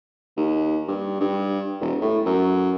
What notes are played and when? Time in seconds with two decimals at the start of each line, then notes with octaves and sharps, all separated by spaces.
0.37 D#2
0.88 G2
1.20 G2
1.81 E1
2.02 A2
2.26 F#2